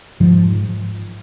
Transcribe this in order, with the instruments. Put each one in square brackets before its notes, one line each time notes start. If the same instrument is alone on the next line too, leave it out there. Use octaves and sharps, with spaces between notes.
[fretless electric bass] G#2 F3